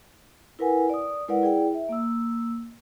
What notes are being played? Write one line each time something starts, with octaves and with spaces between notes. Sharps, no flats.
E4 A#4 B4 F#5 G#5
D5 D#6
G#3 E4 A#4 B4 D5 F#5
E4 G#4 D5 G5
E5
A#3 E6